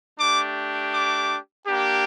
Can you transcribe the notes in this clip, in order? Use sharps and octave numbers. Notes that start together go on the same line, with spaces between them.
A3 D4 G4 D6
D6
A#3 D4 G4